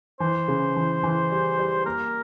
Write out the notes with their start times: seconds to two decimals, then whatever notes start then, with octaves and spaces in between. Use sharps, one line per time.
0.20 E3 C5
0.48 C#3
0.76 E3
1.03 E3
1.31 G3
1.59 G3
1.86 A#3 A#4